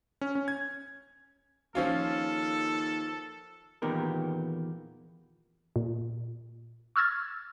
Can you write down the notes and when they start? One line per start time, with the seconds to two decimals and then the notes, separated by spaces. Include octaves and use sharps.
0.21 C#4
0.35 C#4
0.48 G#6
1.75 D#2 F3 C#4 F4 A4
3.82 E2 A#2 D#3 B3 G4 A#4
5.76 A#2
6.96 C#6 E6 F6 G#6 A6